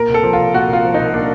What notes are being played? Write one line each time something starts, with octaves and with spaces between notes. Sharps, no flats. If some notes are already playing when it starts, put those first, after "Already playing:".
Already playing: A#2 A#4
C2 A4
F3
F4
C2
A#2 F#4
C2 F4
F3
D#4
C2
A#2 D4